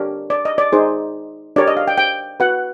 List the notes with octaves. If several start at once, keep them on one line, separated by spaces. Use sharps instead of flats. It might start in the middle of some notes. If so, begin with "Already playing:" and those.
Already playing: D4 G4 A#4 C#5
D5
D#5
D5
D#4 G#4 C5
D4 G4 A#4 C#5 D5
D#5
F5
G5
G5
F#4 B4 F#5